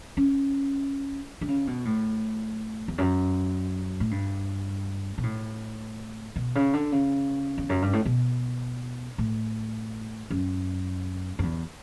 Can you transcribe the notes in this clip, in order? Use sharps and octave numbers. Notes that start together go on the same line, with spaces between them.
C#4
D3
C#3
B2
A2
E2
F#2
A2
G2
B2
A2
B2
C#3
D3
C#3
E2
F#2
G2
A2
B2
A2
F#2
F#2
E2